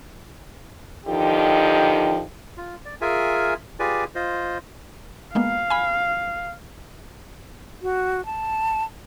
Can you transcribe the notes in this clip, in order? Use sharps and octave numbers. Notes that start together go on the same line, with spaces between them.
D3 D#3 F3 D#4 G4
F4
D5
F4 G#4 A#4 E5 G#5
F4 G4 G#4 B4 D5 G#5
F4 C5 D#5
G#3 A#3 B3 F5
G#5 B5
F#4
A5